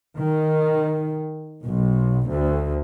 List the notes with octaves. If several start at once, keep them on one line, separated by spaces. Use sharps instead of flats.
D#3
B1
D2